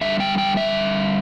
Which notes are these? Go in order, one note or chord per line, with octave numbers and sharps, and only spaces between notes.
D3 G3 E5
G5
G5
E5